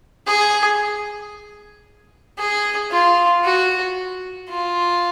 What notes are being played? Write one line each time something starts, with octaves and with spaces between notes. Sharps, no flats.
G#4
G#4
F4
F#4
F4